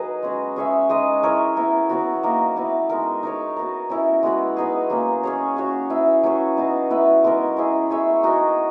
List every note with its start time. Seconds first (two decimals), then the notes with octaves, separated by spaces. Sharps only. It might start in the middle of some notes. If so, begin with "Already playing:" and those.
Already playing: F#3 D#4 G#4 B4 D#5
0.23 G#3 C#4 F#4
0.56 C#4 G#4 C#5 E5
0.89 G#3 D#4 G#4 D#5
1.23 E4 A#4 C#5
1.56 B3 E4 A#4
1.90 F#3 B3 F#4
2.23 A#3 D#4 A#4
2.56 B3 E4 B4
2.90 G#3 D#4 A#4
3.23 D#4 A#4 C#5
3.56 B3 F#4 A#4
3.90 C#4 E4 A#4
4.23 G#3 B3 F#4 B4
4.57 B3 D#4 G#4
4.90 F#3 A#3 C#4
5.23 C#4 G#4 C#5
5.56 C#4 F#4 C#5
5.90 E4 B4 E5
6.23 F#3 C#4 G#4 C#5
6.57 B3 D#4 F#4
6.90 B3 E4 B4 E5
7.24 G#3 B3 D#4 A#4
7.57 C#4 E4 G#4
7.90 C#4 G#4 C#5 E5
8.23 D#4 F#4 A#4 D#5